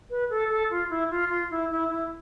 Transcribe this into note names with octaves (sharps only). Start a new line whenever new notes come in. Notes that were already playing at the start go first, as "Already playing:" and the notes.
B4
A4
A4
F4
E4
F4
F4
E4
E4
E4